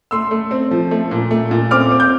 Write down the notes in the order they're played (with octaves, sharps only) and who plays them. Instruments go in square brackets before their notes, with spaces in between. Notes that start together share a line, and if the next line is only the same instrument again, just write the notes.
[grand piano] A3 C6 E6
A3
C4
F3
A3
A#2
A3
A#2
C4 D6 F6
C4
G6